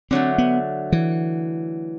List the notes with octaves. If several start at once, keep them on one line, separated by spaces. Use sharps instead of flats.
D3 F#3 A3 C4
B3
E3